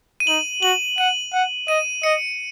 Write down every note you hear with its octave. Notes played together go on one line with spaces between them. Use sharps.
D#7
D#4 F#7
F#4 F#7
F#5 D#7
F#5
D#5 D#7
D#5 C#7